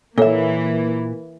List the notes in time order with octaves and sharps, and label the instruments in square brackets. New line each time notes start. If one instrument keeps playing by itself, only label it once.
[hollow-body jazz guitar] A#2 E5 [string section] E3 A#3 [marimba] A4 C#5